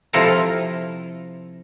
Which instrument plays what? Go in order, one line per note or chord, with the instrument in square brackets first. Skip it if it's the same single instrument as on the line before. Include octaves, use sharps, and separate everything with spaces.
[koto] C3 F3 E4 A4 F5 A#5